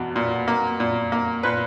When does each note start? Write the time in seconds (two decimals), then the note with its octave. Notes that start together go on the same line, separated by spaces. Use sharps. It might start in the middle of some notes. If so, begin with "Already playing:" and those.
Already playing: E2 B2
0.16 A#2
0.48 A#3
0.80 A#2
1.12 A#3
1.43 A#2 B4